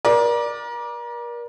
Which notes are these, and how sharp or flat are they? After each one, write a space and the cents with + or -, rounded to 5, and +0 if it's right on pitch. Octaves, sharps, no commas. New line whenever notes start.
A#4 +35 D5 +0